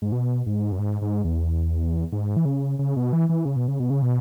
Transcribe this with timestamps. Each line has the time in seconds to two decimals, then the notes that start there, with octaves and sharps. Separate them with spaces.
0.02 G#2
0.12 B2
0.46 G#2
0.72 F#2
0.79 G#2
1.02 G#2
1.24 E2
2.12 G#2
2.37 E3
2.45 C#3
2.79 C#3
2.96 B2
3.13 E3
3.29 E3
3.45 C#3
3.56 B2
3.68 C#3
3.80 B2
3.90 C#3
4.02 B2